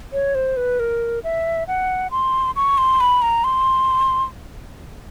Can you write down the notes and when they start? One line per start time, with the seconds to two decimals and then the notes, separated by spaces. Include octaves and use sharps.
0.13 C#5
0.35 C5
0.57 B4
0.80 A#4
1.24 E5
1.68 F#5
2.11 C6
2.56 C#6
2.78 C6
3.00 B5
3.22 A#5
3.44 C6